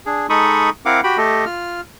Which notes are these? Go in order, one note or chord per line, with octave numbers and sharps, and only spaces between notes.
D4 G#4
G#3 D#4 A4 B5 C#6 D#6
C4 E4 A#4 F5 F#5 D6
F#4 G4 G5 B5
A3 G4 A4 D#5
F4 F6